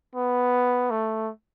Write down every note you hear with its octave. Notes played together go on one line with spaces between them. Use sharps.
B3
A3